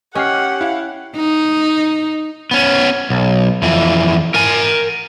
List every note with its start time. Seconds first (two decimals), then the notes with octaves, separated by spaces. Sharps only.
0.15 C#4 G4 D#5 F#5 F6 C7
0.61 E4 F5
1.16 D#4
2.51 B3 C#4
3.10 B1
3.62 F2 E3
4.35 A#4 G#5